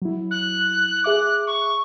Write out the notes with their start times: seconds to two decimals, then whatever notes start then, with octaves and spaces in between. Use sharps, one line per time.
0.02 F#3 E4
0.31 F#6
1.04 G#4 E5 D6 F#6
1.47 C#6